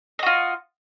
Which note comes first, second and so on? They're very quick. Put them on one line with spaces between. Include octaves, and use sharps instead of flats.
D#5 F#4 F4